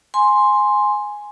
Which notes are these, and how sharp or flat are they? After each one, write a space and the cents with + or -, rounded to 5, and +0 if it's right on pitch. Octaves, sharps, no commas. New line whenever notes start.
G#5 +0 C6 +0